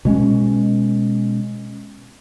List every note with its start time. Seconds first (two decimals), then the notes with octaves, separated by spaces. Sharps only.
0.05 B2 G#3 C#4